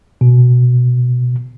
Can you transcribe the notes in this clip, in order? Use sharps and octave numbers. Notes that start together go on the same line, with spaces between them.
B2